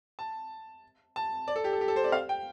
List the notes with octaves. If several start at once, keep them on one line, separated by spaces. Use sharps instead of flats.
A5
A5
D5
A4
G4
A4
G4
A4
C5
D5
F5
G5